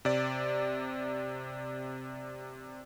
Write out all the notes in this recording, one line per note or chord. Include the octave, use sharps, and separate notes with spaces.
C3 D5